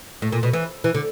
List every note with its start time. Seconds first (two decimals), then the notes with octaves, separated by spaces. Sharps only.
0.22 A2
0.32 A#2
0.43 B2
0.53 E3
0.84 E3
0.95 D3